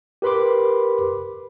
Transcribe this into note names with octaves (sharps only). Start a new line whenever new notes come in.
G4 A#4 B4 B5 C6 D6